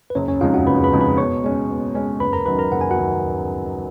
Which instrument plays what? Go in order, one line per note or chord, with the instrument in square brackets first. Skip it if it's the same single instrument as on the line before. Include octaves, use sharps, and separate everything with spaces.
[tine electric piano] B4
[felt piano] F#1 [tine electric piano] C#4 C#5
[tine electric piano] C#4 C#5
[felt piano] F2 C#3 G#3 D#4 [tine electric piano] F4 F5
[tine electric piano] F#4 F#5
[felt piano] F#1 [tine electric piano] B4 B5
[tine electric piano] B4 B5
[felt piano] F2 C#3 G#3 D#4
[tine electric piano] B4 B5
[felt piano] B2 [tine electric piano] C#5 C#6
[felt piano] G#3 C#4
B2
G#3 C#4
[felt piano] F#1 [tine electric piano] B4 B5
[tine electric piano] A#4 A#5
[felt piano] F#2 D#3 F#3 [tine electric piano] B4 B5
[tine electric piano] A#4 A#5
[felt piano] F#1 [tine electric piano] F#5
[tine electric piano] G#5
F#4 F#5
[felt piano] D#3 F#3